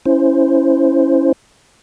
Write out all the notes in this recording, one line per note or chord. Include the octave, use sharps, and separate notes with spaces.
C#4 E4 C5